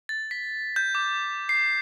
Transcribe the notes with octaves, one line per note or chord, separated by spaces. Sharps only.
A6
B6
G6
D6
C7